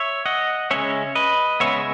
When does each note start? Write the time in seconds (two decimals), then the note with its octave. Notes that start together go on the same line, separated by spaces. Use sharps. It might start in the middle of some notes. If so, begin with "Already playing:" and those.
Already playing: C#5 E5
0.26 D#5 F#5
0.71 C#3 G#3 C#4 C#5 E5
1.15 B4 D#5
1.60 C#3 G#3 B3 C#5 E5